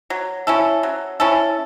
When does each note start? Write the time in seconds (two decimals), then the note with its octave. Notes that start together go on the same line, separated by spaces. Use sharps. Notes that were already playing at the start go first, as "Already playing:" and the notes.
0.10 F#3
0.47 C#4 E4 A4
0.83 F#3
1.20 C#4 E4 A4